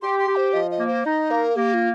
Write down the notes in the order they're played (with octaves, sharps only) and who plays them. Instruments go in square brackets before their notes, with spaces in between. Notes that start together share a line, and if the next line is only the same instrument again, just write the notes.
[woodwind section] G4 [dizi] C6
[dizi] C6
[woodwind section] G4
[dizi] C5
[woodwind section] F3 [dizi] D#5
[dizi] D#5
[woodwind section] A#3
[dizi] C5
[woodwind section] D#4 [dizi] D#5
[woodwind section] A#3 [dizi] A#4
[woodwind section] A#3 [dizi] G4
[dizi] F4